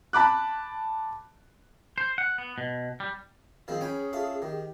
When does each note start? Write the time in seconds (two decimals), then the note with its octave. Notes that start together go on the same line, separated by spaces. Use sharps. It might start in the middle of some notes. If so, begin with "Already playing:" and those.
0.13 A5 B5 D6 F#6
1.98 C5
2.18 F#5
2.38 B3
2.58 B2
3.00 G3
3.68 D#3 F3 C4 G#4
3.81 C#4 G5 G#5 B5
4.13 F4 A4 E5
4.42 D#3 G4